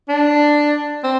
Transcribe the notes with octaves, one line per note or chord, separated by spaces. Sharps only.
D4
C4